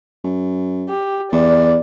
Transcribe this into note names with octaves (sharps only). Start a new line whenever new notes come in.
F#2
G4
E2 D5